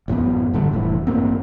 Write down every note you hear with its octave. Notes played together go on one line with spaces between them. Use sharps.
A1 F#2 F#3 B3
A1 G2 D3 G3
F1 A2 E3
A1 G2 A#3 C4